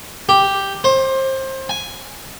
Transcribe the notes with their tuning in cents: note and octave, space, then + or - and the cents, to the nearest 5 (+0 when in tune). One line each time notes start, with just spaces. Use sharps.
G4 +0
C5 +25
G#5 +0